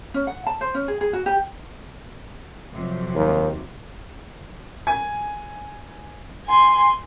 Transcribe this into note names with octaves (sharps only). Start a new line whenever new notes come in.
C#4
F#5
A5
C5
C#4
G#4
G#4
F#4
G4
F2 C3 F#3
D#2
G#5
G#5 C6